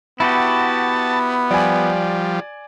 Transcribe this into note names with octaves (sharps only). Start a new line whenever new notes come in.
B3 E4 F#4 G4 A5
F3 G3 D5 G#5